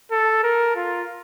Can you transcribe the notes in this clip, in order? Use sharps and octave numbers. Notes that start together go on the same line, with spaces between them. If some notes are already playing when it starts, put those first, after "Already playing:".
A4
A#4
F4